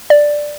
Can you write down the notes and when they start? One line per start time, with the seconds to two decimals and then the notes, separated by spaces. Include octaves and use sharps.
0.10 D5